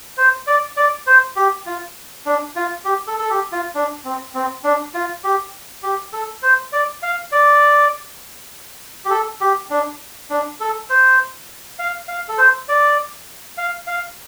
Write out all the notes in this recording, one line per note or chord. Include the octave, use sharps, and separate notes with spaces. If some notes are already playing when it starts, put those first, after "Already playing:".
C5
D5
D5
C5
G4
F4
D4
F4
G4
A4
A4
G4
F4
D4
C4
C4
D4
F4
G4
G4
A4
C5
D5
F5
D5
G4
A4
G4
D4
D4
A4
C5
F5
F5
A4
C5
D5
F5
F5